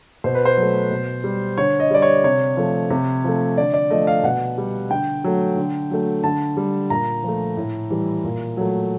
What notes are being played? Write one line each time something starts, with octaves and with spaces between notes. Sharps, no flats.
B2 C5
B4
C5
F#3 A3
B2
G3
D3 C#5
D#5
G3 D5
C#5
C3 C#5
F3 A3
C3
F3 A3
D3 D5
D5
F3 A3 D#5
F5
B2 F#5
G3
D3 G5
F#3 A3
D3
F#3 A3
D3 A5
G3
A#2 A#5
F3 A3
A2
E3 G3
A#2
F#3 A3